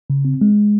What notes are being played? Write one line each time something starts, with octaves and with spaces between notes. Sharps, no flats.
C#3
C4
G#3